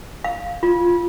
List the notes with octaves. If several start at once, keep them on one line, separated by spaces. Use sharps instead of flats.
F5
F4